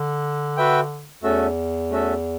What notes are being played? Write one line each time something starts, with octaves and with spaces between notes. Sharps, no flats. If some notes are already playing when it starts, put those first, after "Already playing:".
Already playing: D3
F#4 B4 E5 G5
E2 A3 C#4 F#4 A4 E5
A3 C#4 F#4 A4 E5